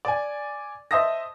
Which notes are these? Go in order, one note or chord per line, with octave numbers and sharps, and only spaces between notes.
D5 G#5
C5 D#5 E5 A5 D#6 A#6